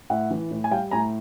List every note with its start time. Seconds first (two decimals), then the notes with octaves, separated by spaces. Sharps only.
0.10 A2 E5 F#5
0.31 E3
0.51 A2
0.64 G#5
0.71 G3 F5 G5
0.91 A2 G#5 A#5